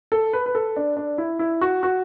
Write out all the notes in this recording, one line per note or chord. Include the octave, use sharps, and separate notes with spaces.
A4
B4
B4
A4
D4
D4
E4
E4
F#4
F#4